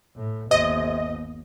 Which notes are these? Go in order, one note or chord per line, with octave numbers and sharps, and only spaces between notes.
A2
G1 D#2 C3 D#5